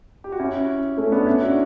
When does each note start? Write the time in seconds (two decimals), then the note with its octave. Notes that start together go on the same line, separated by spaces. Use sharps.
0.24 G4
0.32 F#4
0.39 C#4 E4
0.97 A3 C#4
1.12 B3 D4
1.27 C#4 E4
1.41 D4 F#4